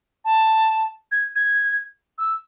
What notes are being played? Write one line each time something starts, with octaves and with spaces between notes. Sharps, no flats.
A5
G#6
G#6
E6